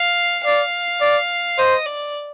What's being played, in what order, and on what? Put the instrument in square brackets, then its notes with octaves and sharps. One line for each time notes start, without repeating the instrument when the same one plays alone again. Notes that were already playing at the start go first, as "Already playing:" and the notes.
Already playing: [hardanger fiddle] F5
[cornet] D5 [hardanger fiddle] F5
[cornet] D5
[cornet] C5 [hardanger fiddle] D#5
[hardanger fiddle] D5